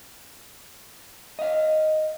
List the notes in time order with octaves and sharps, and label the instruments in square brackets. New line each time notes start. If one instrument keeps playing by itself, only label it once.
[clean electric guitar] D#5 F5